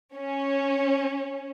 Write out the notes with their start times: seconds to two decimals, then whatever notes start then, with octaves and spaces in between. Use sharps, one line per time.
0.16 C#4